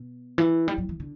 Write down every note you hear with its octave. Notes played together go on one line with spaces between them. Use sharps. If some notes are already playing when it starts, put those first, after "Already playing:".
Already playing: B2
E3
G3
F#3
E3
D3